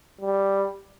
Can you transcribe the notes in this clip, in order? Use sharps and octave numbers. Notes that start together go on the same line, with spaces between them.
G3